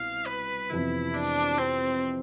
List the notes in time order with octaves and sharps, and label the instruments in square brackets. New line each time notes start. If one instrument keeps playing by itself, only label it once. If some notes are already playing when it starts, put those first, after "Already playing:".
Already playing: [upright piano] C2 B2 [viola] F5
[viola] B4
[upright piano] F2 C3 E3 B3 [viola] E4
[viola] D4
C4